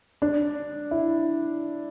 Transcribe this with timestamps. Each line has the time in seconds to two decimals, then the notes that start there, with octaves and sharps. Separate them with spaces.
0.22 D4
0.91 E4